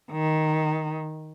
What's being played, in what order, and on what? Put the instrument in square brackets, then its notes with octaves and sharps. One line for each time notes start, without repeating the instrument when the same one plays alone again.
[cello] D#3